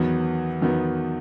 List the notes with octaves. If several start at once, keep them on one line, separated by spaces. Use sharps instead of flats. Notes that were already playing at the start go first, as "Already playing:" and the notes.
Already playing: E2 D#3 F#3 B3
E2 D#3 F#3 B3